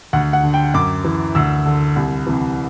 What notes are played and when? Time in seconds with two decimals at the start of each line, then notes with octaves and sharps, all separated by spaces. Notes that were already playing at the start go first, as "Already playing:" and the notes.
0.13 D2 F#5
0.33 F#5
0.43 D3
0.54 G5
0.74 F#2 D6
1.04 E3
1.35 D2 E6
1.65 D3
1.96 C2
2.27 C3 E3